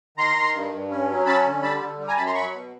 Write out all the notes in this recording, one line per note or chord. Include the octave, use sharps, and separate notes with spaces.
D#3 A#5 C6
D#3
G2
G2
C#4
F#3
C#4 A5 B5
D3
G3 A5 B5
D3
G3
G#5 A#5
F#2 A5 B5
A#5 C6
F#3 B5 C#6
B2